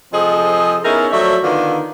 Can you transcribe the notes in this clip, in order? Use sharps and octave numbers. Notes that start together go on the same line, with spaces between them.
C3 F3 G#4 A4 D#5
B3 C#4 D#4 E4 G#4 A#4
F3 F#3 A3 C#5 D5 E5
D3 D#3 B3 D4 F4